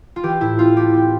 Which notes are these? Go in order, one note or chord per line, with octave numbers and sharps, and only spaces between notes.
F4
E3 G4
A2 E4
C4 F4
A3 G4
C4